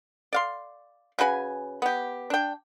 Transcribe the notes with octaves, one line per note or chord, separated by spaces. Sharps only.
D5 F5 C6
C#3 F#4 B4 G#5
B3 G4
D4 G5